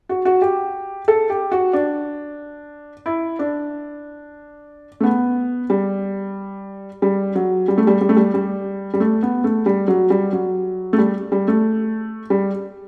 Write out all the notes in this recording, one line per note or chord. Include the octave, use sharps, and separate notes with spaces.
F#4
F#4
G4
A4
G4
F#4
D4
E4
D4
A3
B3
G3
G3
F#3
G3
A3
G3
G3
A3
G3
G3
G3
A3
B3
A3
G3
F#3
G3
F#3
A3
G3
G3
A3
G3